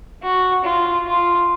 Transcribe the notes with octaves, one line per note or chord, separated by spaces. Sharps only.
F#4
F4
F4